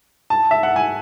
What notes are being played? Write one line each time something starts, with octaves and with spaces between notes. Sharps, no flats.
A5
E5
F#5
G#5